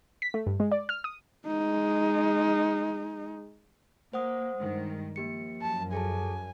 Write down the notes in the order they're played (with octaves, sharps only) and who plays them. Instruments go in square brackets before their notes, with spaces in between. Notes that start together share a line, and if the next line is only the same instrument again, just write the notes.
[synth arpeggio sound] B6
A3
G2
G#3
D5
F6
D#6
[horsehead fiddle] G#3 D#4
[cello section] A#3 [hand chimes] C5 F#5 D#6
[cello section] G2 D#3 G#3
[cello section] F3 [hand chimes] A#3 G4 C#7
[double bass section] F#2 [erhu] A5
[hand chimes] G#4 A4 A5 [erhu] G#5